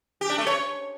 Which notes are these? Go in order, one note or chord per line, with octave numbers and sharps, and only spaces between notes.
G4
D4
A3
C#5